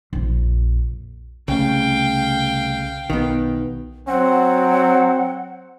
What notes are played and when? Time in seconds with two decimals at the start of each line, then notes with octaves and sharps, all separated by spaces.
0.13 A#1 F2
1.48 C2 C#3 A3 F5 G5
3.10 B1 D#3 B3
4.08 F#3 C4 F#5